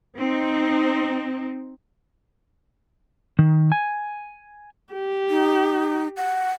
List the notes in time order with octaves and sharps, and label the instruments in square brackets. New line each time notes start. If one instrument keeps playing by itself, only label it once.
[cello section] C4 D#4
[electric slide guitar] D#3
G#5
[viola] G4
[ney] D#4
F#5